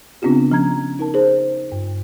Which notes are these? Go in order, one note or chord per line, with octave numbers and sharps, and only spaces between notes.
C#3 B3 C4 D4 F4 G4
F3 C#4 A#5 G#6
D#4 A#4 A5
G#4 C5
G2